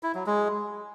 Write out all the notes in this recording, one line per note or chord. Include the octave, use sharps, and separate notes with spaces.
E4
F#3
G#3